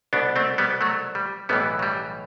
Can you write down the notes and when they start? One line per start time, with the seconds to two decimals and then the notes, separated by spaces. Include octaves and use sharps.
0.13 C2 B2 B3 D4
0.36 A3 C4
0.58 G3 B3
0.81 F#3 A3
1.15 G3
1.49 B1 A2 E3 G3 B3
1.79 F#3
1.83 G3